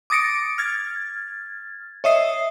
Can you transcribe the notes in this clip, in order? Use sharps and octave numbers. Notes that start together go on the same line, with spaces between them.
D6 D#6 A6 A#6 C#7 D7
F6 G#6 A6
C#5 D#5 E5 D#6 C7